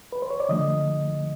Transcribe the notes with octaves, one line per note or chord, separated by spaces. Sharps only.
B4
C5
C#5
D5
D3 F3 A3 D#5